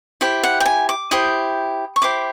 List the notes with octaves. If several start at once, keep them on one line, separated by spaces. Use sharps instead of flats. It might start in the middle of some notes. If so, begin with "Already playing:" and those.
E4 G4 C5
F#5
G5
G#5
D6
E4 G4 C5 D#6
C#6
E4 G4 C5 D6